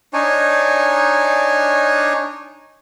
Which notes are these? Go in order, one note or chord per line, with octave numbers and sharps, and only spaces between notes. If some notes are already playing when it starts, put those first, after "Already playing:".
D4 D#4 C#5 G#5